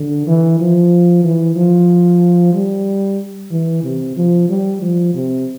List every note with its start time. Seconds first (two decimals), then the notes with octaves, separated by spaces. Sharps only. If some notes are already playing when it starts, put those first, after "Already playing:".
Already playing: D3
0.27 E3
0.60 F3
1.24 E3
1.56 F3
2.54 G3
3.51 E3
3.84 C3
4.17 F3
4.49 G3
4.82 F3
5.14 C3